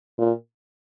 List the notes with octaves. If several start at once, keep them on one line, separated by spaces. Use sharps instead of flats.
A#2